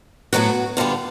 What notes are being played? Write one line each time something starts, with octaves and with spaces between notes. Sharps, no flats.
A2 F#3 B3 F#4
D3 G3 B3 F4